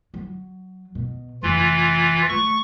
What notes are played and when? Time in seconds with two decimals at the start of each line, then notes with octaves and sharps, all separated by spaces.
0.14 F#3
0.95 B2
1.43 F1 E3 F4
2.29 A3 C#6